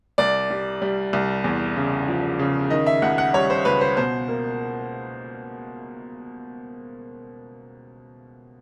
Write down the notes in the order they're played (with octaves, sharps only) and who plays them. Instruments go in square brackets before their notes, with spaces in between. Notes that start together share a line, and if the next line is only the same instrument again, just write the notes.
[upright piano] C2 D5
G3
G3
C2
E2
C#3
F3
C#3
D#3 D#5
E5
C#2 F#5
F#5
G3 C#5
C5
C#2 B4
C5
B2 C5
A#3